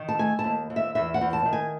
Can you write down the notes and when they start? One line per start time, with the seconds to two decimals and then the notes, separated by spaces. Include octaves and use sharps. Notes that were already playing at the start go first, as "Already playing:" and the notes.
Already playing: D#3
0.09 A5
0.19 A3 G#5
0.39 A5
0.44 D#2
0.70 D#2
0.76 E5
0.95 E2 E5
1.14 F#5
1.21 E2
1.33 A5
1.46 D#3
1.53 G#5